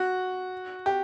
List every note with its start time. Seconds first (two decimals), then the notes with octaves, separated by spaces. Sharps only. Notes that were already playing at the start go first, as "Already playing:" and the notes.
Already playing: F#4
0.86 G4